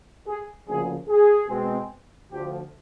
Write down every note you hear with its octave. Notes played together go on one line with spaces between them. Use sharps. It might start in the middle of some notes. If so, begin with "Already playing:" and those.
G#4
D2 C#3 F3 A#3 G#4
G#4
B2 G#3 C4
D2 D3 F3 G4